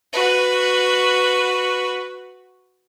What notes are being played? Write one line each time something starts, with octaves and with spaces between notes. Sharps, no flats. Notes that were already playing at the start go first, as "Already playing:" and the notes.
F#4 B4